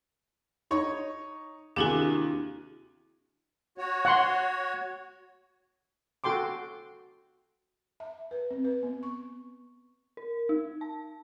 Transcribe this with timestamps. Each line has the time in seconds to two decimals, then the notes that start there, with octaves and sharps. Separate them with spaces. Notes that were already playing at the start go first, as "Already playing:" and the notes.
0.71 D#4 C#5
1.76 D#2 C3 D4 E4 F#4 G#4
3.78 F#4 C#5
4.05 F#5 C6
6.24 F#4 A4 G5 C6 D6
8.00 E5
8.31 B4
8.51 C4
8.64 B4
8.83 B3
9.03 C#6
10.17 A#4
10.49 D#4
10.81 A5